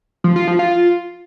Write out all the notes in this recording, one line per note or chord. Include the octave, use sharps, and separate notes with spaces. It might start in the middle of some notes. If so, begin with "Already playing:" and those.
F3
F4
F3
F4